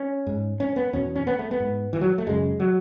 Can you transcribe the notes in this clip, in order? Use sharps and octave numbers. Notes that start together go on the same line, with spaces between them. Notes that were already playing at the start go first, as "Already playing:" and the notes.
Already playing: C#4
G#2
C#4
B3
E2 B2 C#4
C#4
B3
A3
B3
G#2
E3
F#3
A3
F#2 C#3 G#3
F#3